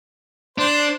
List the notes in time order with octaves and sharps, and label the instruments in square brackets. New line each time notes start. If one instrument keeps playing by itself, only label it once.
[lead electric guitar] D4 [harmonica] C5